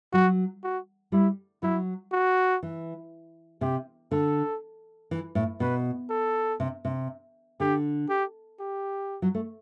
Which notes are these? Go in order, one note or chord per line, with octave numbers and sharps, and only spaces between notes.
F#3 F#4
F#4
G3 E4
F#3 E4
F#4
E3
C3 G4
D3 A4
E3
A2
B2 B4
A4
C3
C3
D3 G4
G4
G4
F#3
A3